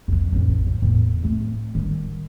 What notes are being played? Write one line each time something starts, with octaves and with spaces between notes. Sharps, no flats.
F2 F#3
A1 F2
F3
E2 A2
A3 C4
D#3 G3